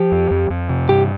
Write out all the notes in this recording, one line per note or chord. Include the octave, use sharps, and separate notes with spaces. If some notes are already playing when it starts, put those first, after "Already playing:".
Already playing: F3 G4
F2
F2
F2
C3
G2 G4